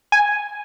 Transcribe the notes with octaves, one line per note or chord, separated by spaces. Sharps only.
G#5